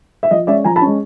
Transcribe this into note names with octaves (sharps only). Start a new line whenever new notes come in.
E5
F3 D#5
G#3 C#4 D5 E5
F3 G#5 A#5
A5 B5
G#3 C#4